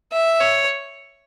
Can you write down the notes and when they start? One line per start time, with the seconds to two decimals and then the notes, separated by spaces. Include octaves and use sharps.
0.12 E5
0.40 C#5